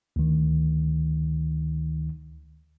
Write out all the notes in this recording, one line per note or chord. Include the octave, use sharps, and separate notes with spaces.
D2 D#3